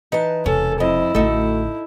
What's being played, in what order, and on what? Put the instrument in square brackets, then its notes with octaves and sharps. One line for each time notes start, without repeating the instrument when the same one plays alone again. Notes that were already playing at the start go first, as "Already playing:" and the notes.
[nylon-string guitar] E3 B4 [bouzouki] D#4 A5
[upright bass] E1 C3 [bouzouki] C#4 [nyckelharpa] A4
[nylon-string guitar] F2 [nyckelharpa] E4 [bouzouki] D#5
[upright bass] A1 D3 [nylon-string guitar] A3 F#4 [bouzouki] D#4 A4